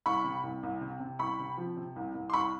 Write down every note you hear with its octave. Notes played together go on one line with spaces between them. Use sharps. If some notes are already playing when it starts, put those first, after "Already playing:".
C2 B5 C#6
C3
C2
C2
C3
C3
C2 B5 C#6
C3
F3
C3
C2
C2
C6
C2 B5 C#6